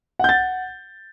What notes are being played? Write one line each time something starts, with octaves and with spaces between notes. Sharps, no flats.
F#5 G6 A6